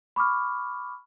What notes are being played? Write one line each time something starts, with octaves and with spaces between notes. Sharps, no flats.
B5 C#6 D6 F6